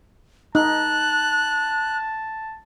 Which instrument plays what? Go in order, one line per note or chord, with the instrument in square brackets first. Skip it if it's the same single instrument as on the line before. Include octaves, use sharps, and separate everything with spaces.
[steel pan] D#4 [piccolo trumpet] A5 [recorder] F#6